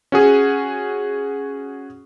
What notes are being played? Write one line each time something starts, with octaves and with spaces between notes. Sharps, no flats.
C#4 F#4 G#4